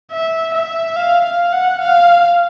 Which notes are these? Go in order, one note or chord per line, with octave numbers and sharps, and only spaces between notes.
E5
E5
F5
F5
F#5
F5